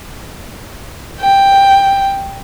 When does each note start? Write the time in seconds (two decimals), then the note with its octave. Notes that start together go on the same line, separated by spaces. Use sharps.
1.21 G5